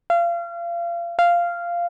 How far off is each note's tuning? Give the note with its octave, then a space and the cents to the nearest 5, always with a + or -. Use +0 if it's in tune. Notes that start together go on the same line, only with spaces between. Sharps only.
F5 -30
F5 -10